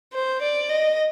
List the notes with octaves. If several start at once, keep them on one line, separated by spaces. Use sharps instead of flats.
C5
D5
D#5